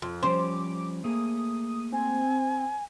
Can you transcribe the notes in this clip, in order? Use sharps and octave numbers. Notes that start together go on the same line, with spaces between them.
F2
F3 G3 C#4 C5 D6
A3 A#3 G#4 D#6
C4 G#5